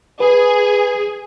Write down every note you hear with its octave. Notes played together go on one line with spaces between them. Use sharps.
G#4 B4